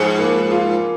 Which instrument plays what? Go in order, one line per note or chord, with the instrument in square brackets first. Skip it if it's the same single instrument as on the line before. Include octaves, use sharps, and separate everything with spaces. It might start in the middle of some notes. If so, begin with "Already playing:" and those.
Already playing: [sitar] G#2 [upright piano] F3 G#4
[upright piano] A#3
F4